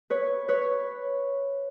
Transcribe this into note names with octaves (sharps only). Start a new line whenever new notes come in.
B4 C#5
B4 C#5